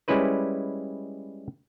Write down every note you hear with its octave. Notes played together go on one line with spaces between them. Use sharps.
G3 G#3 C#4 E4 B4 C5